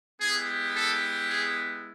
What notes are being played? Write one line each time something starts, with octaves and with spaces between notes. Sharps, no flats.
G#3 B3 E4 G4 G#4
A4
G#4